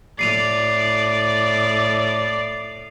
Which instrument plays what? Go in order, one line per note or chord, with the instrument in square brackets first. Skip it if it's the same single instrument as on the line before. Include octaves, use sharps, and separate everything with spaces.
[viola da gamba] A2 [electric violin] D5 [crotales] C7 D#7 F7